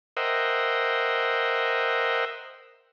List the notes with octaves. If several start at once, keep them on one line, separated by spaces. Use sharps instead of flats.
A#4 C5 D#5 E5 F#5 G5